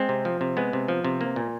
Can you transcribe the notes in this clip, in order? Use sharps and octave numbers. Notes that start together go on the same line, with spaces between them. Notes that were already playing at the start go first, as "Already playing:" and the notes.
Already playing: G#3 C4
C3
F3
C3
G#3 B3
C3
F3
C3
A#3
A#2